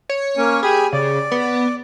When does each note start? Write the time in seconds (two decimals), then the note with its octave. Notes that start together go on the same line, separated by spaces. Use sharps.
0.09 C#5
0.37 A#3 C#4
0.63 G4 G#4 G#5 B5
0.93 C#3 D5
1.31 B3